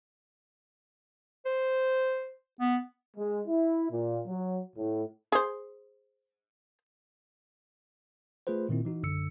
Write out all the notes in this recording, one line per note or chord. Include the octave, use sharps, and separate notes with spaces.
C5
B3
G#3
E4
A#2
F#3
A2
G#4 C5
A3 F4 G#4 B4 C5
A#2 D#3 C4 E4
E3 D#4 F#4
A#1 F#2 D3 E6 C#7